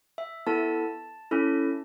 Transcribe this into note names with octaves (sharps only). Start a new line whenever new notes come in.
E5
B3 E4 A4 A5
C#4 E4 A4